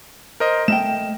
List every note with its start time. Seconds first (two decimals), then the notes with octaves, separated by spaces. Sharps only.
0.40 A#4 C5 D#5
0.68 A3 D#5 G5 E7